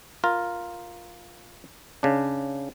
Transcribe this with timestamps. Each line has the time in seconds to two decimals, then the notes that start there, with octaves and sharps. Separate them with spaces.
0.24 F4 A#4
2.03 C#3 D4